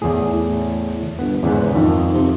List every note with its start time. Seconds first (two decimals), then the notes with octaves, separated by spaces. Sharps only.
0.02 E2 A2 G#4
0.33 A2
1.19 G1 B3
1.43 E2 G#2 C#3 B3
1.75 F2 D#3
2.14 C3